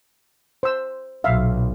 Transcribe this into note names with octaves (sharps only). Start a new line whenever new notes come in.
C5 E6
B1 A#2 E5 F5